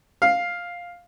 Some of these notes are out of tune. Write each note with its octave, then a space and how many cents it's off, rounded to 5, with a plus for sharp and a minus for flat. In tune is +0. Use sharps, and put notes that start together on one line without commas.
F5 +5